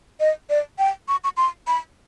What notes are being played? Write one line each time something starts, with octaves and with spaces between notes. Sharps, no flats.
D#5
D5
G5
C#6
C#6
C6
B5